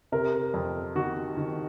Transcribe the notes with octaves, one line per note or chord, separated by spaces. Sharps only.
C3 A#4
F2
D#3 F#4
D#3